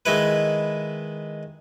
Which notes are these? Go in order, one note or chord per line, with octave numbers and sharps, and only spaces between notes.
D#3 G#3 E4 B4